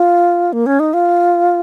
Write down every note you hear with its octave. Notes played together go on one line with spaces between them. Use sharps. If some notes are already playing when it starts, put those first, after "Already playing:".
Already playing: F4
A#3
C#4
D#4
F4